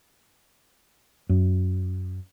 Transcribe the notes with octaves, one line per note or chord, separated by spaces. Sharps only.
F#2